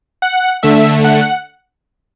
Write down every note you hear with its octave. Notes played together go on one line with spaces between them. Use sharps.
F#5
D3 A3 E5
F#5